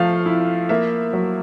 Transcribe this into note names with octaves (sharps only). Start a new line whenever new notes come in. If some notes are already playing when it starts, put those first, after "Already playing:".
Already playing: F3 A3 F5
E4
A#3 E5
F#3